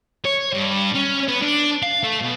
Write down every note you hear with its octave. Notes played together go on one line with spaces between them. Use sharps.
C#5
G2
C#4
B3
D4
F5
A3
B2